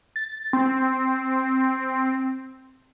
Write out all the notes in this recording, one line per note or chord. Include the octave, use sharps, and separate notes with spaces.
A6
C4